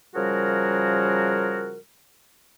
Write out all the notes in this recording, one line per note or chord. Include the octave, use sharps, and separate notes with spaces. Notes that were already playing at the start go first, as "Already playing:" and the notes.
C#3 F3 G3 F#4 G#4 A#4